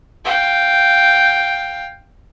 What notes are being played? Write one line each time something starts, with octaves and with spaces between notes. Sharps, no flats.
F5 G5